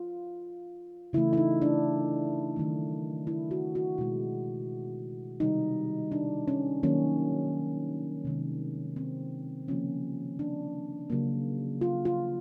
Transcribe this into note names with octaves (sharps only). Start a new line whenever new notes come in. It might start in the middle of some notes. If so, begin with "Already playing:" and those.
Already playing: F4
C#3 E3 A3 E4
E4
D#4
D4
D#3 F#3 A3
E4
F#4
F#4
B2 G#3 E4
C3 D#3 G3 D#4
D4
C#4
D#3 F#3 A#3 C#4
C3 D#3 G#3
C4
C#3 F3 A#3 C#4
D4
C#3 F#3 A#3
F4
F4